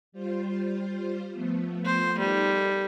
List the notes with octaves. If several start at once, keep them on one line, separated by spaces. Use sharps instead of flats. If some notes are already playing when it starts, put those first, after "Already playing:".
G3 F4 C5
F3 A3 B3
C5
G3 D#4 A4 A#4